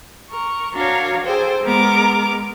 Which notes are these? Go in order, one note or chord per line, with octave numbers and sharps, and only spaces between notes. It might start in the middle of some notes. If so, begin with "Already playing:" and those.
A#4 C#6
D4 F#4 A#4 C#5 F5
G#4 A4 C5 G5
G#3 B3 A#4 D6